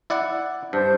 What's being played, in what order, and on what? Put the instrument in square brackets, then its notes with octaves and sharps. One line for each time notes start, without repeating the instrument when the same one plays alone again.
[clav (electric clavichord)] E4 D5 F#5
[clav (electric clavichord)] G2 [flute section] C5 A5 G6